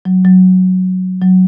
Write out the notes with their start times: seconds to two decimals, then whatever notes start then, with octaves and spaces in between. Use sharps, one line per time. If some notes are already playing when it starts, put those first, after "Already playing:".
0.05 F#3
0.25 F#3
1.22 F#3